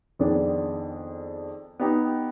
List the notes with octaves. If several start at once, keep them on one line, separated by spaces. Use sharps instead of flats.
F2 D#3 B3 D4 G#4
B3 D#4 G4